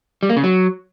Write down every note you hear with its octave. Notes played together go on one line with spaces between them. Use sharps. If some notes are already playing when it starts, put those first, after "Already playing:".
G3
A#3
C#3
F#3